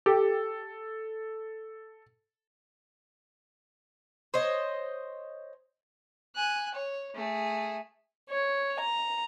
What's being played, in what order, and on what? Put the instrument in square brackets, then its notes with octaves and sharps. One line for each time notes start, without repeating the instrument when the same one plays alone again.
[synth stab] G4 [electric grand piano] A4
[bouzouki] C5 C#5 D#5
[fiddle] G#5 F#6
C#5
A3 G#4
[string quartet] C#5
A#5